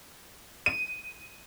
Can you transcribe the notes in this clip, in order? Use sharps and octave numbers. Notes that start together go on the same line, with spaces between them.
D#7